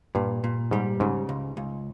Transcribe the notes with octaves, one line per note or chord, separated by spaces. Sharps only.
G2 A#2
A#2
G#2 G3
G#2 C#3
C#2
C#2